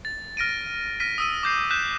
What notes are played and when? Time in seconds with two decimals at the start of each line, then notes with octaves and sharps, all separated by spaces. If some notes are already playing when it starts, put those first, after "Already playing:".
0.05 A6
0.37 F6 A#6 D7 D#7
1.00 F6 A#6 B6 D#7
1.18 D#6 E6 D#7
1.43 D6 G6 C7
1.70 F#6 G6 B6 E7